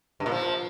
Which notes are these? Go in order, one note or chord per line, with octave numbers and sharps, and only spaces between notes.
G2
A#2
F3